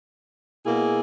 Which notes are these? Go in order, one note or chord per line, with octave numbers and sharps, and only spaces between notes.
B2 A#3 E4 G#4